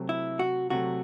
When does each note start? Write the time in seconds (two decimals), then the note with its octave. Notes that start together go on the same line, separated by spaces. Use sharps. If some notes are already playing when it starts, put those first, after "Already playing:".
Already playing: C3 F#3 A3 C4
0.09 E4
0.39 F#4
0.70 C3 F#3 A3 F#4